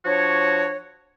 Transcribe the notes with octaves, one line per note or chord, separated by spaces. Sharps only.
F3 D4 F#4 C#5